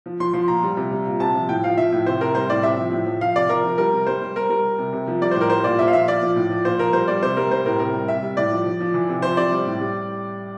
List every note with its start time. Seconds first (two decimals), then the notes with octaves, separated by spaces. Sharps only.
0.06 F3
0.20 F3 C6
0.34 F3 C6
0.48 A#2 A#5
0.63 G3
0.77 C3
0.91 G3
1.05 A#2
1.20 C3 A5
1.35 F3
1.49 A2 G5
1.64 F3 F5
1.77 F3 E5
1.92 A2
2.06 C3 C5
2.21 C3 A#4
2.35 G3 C5
2.49 A2 D5
2.63 C3 E5
2.77 F3
2.93 A2
3.06 F3
3.20 F3 F5
3.36 C3 D5
3.49 F3 A#4
3.64 F3
3.78 G3 A#4
3.93 C3
4.07 G3 C5
4.22 G3
4.36 G3 A#4
4.50 G3 A#4
4.64 G3
4.79 C3
4.93 C3
5.07 F3
5.21 G3 D5
5.31 A2 C5
5.41 A#4
5.50 G3 C5
5.64 A#2 D5
5.79 A#2 E5
5.88 F5
5.93 F3 E5
6.08 A#2 D5
6.22 F3
6.36 A2
6.50 F3
6.65 A#2 C5
6.79 F3 A#4
6.93 G3 C5
7.08 G3 D5
7.23 C3 C5
7.37 G3 A#4
7.51 G3 C5
7.65 A2 A#4
7.79 C3 A#4
7.94 G3
8.08 C3 E5
8.23 G3
8.37 A2 D5
8.51 F3
8.66 F3
8.80 F3
8.94 E3
9.09 C3
9.22 F3 C5
9.37 C3 D5
9.52 G3
9.66 A2
9.80 G3